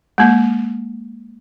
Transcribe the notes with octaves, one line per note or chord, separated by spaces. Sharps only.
G#3 A#3